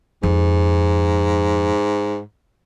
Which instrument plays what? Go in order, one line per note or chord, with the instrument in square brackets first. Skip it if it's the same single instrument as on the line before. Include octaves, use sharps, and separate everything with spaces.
[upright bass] F2 [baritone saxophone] G#2